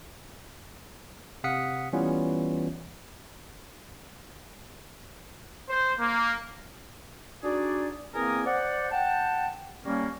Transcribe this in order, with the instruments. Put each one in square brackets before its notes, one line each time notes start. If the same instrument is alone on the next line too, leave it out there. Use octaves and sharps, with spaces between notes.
[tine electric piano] C3 F5 F#5 D#6 B6 C#7
E3 G3 B3 C#4 F4
[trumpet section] C5
A#3
[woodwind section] D4 D#4 F#4 G#4 D5
E2 A#3 C4 A#4 G#5 D#6
C5 D5 F#5
F#5 G5 A5
G3 A#3 C#4